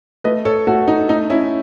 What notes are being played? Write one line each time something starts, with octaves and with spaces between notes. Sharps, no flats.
A3 B4 D#5
A4 C#5
A3 F#4 A4
D#4
A3 D#4
C#4 E4